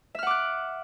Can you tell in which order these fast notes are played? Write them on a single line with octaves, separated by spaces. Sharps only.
E5 F6 F#5 D6 F#6